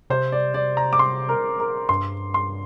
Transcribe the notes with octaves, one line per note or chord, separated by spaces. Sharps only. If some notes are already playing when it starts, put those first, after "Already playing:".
C3 C5
D5
D5
A#5
D6
C6
A#4
A#4
G2 C6
C6